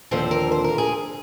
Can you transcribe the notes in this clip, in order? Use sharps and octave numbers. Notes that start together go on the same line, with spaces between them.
D#2 D3 F3 C4 C5
A#4
C5
A#4
G#4